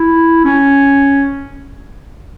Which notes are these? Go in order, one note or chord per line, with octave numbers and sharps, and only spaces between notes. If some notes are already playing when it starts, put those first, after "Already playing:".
Already playing: E4
C#4